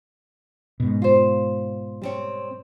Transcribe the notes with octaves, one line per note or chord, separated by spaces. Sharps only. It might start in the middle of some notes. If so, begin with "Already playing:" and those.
G#2 B2
F4 C5
G3 C4 C#5